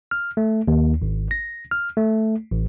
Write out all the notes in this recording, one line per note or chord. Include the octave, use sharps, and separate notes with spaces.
F6
A3
D#2
G#1
A#6
F6
A3
A1